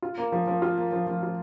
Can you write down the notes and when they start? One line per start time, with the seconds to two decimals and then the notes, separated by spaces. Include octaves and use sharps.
0.02 F4
0.18 A#3
0.32 F3
0.47 F3
0.62 F4
0.78 A#3
0.92 F3
1.07 F3
1.23 F4